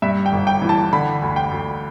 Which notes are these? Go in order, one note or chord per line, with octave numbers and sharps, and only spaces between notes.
G2 E5
G5
G1
G5
E3
A5
D3 B5
D2
G5
D2